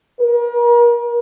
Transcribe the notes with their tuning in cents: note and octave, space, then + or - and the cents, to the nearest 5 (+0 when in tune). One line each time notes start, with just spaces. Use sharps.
A#4 +40